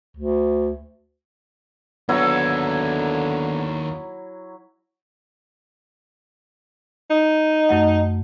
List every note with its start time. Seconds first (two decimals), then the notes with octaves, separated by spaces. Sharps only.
0.17 D2
2.09 D#2 D3 F#3 B3 E4 A4
7.10 D#4
7.69 F#2 A3 F#5